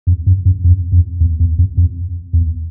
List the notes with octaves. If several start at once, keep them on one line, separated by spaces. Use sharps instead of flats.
F2
F#2
F#2
F2
F2
E2
E2
F2
F2
E2